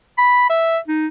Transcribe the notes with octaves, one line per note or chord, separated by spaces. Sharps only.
B5
E5
D#4